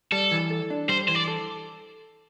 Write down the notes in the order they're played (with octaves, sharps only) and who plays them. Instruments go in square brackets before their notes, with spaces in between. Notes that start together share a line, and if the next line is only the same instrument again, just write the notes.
[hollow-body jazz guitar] G3 [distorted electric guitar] A4
[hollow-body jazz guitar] E3
A4
D4
[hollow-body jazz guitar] G3 [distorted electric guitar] C5
[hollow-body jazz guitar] E3 [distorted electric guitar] C5
[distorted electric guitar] D5
[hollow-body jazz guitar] A4